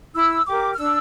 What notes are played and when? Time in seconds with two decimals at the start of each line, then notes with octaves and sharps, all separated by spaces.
0.14 E4 E6
0.46 G4 A#4 D6
0.73 F6
0.78 D4 E6